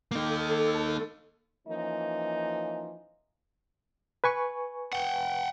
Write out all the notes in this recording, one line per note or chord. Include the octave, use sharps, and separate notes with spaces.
A#3 D#4 A4
E3 F3 A#3 C#4 D#4
B4 G#5 C#6
F#5 G5